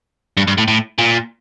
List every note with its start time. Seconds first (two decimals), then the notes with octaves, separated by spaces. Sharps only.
0.37 G2
0.47 G2
0.58 A2
0.68 A2
0.98 A#2